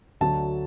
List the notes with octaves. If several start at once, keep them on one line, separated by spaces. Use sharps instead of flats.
D2 D3 F#3 A5